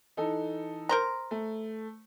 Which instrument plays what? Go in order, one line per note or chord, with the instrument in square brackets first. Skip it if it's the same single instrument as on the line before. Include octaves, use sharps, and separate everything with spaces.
[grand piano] E3 D#4 A4
[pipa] A#4 C5 A#5
[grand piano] A3